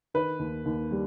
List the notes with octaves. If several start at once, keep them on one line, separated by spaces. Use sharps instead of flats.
D#3 B4
D#2
D#2
G3